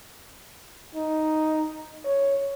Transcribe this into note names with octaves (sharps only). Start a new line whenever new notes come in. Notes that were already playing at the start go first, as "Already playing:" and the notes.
D#4
C#5